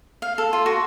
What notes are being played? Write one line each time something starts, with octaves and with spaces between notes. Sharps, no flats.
F5
A4
F4
F#4